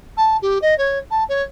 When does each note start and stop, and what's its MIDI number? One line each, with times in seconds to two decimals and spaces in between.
0.17 0.37 81
0.42 0.58 67
0.62 0.77 75
0.78 0.98 73
1.11 1.24 81
1.29 1.43 73